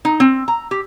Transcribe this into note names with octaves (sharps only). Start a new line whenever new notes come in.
D#4
C4
A#5
G4